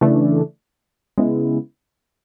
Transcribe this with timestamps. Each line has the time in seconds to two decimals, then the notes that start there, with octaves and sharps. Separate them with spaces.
0.01 C#3 E3 A3 D4
1.18 C#3 G#3 B3 E4